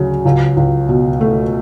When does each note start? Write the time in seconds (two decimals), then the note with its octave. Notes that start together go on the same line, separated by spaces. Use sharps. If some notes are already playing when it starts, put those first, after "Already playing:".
Already playing: D2 C#3 F#3
0.25 C#2
0.57 C#2
0.89 B2
1.21 A3